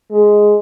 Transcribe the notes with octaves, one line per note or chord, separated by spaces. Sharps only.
G#3